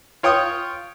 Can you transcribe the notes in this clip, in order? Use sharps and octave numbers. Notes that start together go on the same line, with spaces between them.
F4 C#5 G5 C#6 D#6